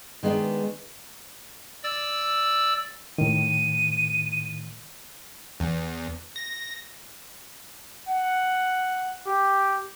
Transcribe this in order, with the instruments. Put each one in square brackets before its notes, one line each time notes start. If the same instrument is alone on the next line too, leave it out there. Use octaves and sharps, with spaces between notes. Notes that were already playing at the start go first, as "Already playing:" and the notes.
[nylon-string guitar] D#3 G#3 B3 D4
[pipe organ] D5 E6
[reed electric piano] A2 D#3 [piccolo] D#7
[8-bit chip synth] E2
A#6
[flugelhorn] F#5
G4